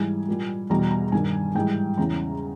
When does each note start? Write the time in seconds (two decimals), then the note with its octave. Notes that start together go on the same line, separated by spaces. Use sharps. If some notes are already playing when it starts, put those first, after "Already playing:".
Already playing: G#2 E3 G3 G#5
0.28 A#2 G3
0.70 E2 B2 G3 A#5
0.91 A#5
1.12 G2 D#3 G3 G#5
1.55 G#2 E3 G3 G5
1.98 E2 C#3 E3 G3 A#5